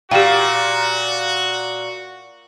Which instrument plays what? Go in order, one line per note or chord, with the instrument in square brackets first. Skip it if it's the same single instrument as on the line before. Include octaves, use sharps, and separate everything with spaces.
[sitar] A#2 [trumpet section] F#4 [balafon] G4 G5 [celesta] F5